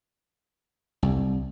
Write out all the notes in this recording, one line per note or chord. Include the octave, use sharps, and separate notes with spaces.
C2